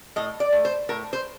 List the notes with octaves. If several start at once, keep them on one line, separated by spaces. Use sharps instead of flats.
A2 D#5
D5
A3
C5
A2 A#4
C5